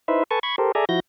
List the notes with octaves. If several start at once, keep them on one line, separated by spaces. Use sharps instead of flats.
D#4 E4 B4 C5 E5
A4 B4 G#5 A5 C#6
B5 C#6 G#6
G4 A4 A#4 C5
G#4 A4 D5 E5 G#5 A#5
F3 E4 F#4 G6 A#6